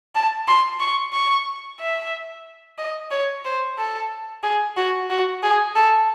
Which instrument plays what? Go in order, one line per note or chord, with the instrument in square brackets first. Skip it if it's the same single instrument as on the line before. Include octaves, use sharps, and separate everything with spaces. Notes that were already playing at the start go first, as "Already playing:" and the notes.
[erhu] A5
C6
C#6
C#6
E5
D#5
C#5
C5
A4
G#4
F#4
F#4
G#4
A4